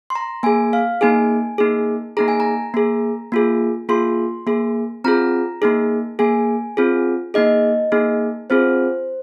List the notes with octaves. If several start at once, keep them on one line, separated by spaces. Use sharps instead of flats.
C6
A#5
A#3 G#4 G#5
F5
A#3 D#4 G#4 G#5
A#3 D#4 G#4
A#3 D#4 G#4 A#5
G#5
A#5
A#3 G#4
A#3 F4 G#4
A#3 F4 G#4 C6
A#3 G#4
C4 F4 G#4 A#5
A#3 D#4 G#4
A#3 G#4 G#5
C4 F4 G#4
A#3 D#4 G#4 D#5
A#3 D#4 G#4
C4 F4 G#4 C5